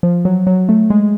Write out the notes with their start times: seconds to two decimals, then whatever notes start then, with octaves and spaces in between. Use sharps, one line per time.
0.03 F3
0.25 F#3
0.47 F#3
0.69 A3
0.90 G#3